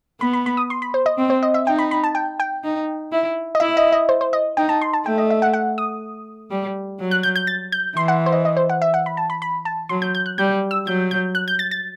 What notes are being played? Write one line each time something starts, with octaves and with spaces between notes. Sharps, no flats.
B3 B5
B5
B5
D#6
C6
B5
C5
D#5
C4
C5
D#5
E5
D#4 G5
B5
B5
A5
G5
G5
D#4
E4
D#5
E4 E5
D#5
D#5
C5
C5
D#5
D#4 G5
A5
C6
A5
A3 G5
D#5
E5
F#5
F#5
D#6
G3
F#3
F#6
G6
G6
A6
G6
E3 C6
F#5
C5
D#5
D#5
C5
F#5
E5
F#5
B5
A5
B5
B5
A5
F#3 C6
G6
G6
F#6
G3 G6
E6
F#3 G6
G6
F#6
G6
A6
A6